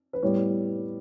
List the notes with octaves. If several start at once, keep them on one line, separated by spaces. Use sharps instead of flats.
B4
A2 G3 B3 C#5